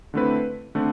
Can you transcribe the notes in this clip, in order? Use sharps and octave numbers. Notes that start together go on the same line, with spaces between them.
D3 A3 C4 E4 B4
D3 A3 C4